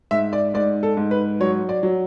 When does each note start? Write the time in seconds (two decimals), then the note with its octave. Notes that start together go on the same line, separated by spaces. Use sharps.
0.11 G#2 E5
0.33 D5
0.54 G#2 D5
0.83 A4
0.97 G#2
1.11 B4
1.40 F#3 C#5
1.69 D5
1.83 F#3